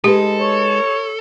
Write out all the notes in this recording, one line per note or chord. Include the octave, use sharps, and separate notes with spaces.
G#3 D#4 G4 A4 B4
C#5